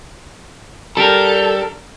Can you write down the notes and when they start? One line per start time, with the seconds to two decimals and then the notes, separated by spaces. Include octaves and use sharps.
0.97 G3 D4 A4 A#4